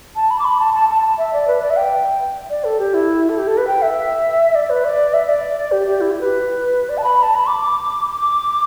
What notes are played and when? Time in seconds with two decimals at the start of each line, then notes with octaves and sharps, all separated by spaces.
0.16 A5
0.30 B5
0.39 D6
0.45 B5
0.60 A5
0.74 A5
0.89 A5
1.18 E5
1.33 D5
1.48 B4
1.62 D5
1.70 E5
1.77 G5
2.50 D5
2.64 A4
2.79 G4
2.94 E4
3.29 A4
3.38 G4
3.47 A4
3.57 B4
3.67 G5
3.82 E5
4.55 D5
4.70 B4
4.84 D5
5.14 E5
5.29 D5
5.72 G4
5.87 G4
6.01 E4
6.11 G4
6.21 B4
6.89 D5
6.98 A5
7.04 B5
7.23 A5
7.35 B5
7.48 D6
8.07 D6
8.21 D6